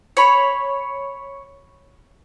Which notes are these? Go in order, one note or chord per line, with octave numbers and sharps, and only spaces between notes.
C#5 B5